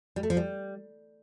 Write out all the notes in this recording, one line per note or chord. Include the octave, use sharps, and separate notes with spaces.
G3
A3
F3
G3